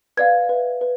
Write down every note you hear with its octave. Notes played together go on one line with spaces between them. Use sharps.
B4 D5 F5 G#6
B4 E5
B4